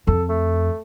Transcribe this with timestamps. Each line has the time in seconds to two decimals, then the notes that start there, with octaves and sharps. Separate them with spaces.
0.07 F2 A4
0.29 A3